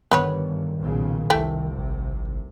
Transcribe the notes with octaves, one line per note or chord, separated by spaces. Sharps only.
G1 G2 D#3 B3 B4 C#5
B1 A#2 C#3
F1 C2 C3 E3 A3 G5
G#1